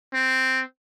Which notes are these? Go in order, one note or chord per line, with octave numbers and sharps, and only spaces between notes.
C4